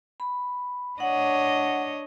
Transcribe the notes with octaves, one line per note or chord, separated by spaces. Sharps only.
B5
D4 C#5 D#5 F#5